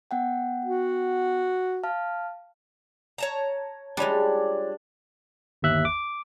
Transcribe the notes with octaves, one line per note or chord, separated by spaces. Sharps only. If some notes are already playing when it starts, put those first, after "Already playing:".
B3 F#5 G5
F#4
F5 A5 F6
C#5 A5 A#5
G3 G#3 D4 F4 C#5
G1 D#2 E5 F#6
D6